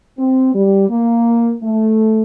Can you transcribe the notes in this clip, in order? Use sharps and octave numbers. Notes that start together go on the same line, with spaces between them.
C4
G3
A#3
A3